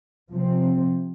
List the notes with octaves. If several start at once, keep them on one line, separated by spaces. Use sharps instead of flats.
C3 F3 C4